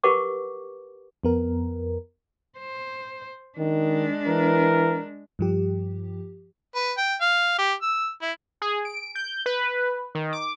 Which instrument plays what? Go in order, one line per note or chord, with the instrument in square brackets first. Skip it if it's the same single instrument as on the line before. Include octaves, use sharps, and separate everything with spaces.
[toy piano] G4 A#4 B4 F#5 C#6 D6
[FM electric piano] F2 B3 A#4
[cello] C5
[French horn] D#3 [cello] G#3 D4
[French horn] E3 [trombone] A#4
[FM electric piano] G2 F3 G4
[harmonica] B4
G5
F5
G4
E6
E4
[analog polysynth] G#4
D7
G6
B4
D#3
D6